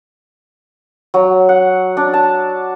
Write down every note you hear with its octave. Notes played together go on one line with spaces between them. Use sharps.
F#3
F#5
D4
A5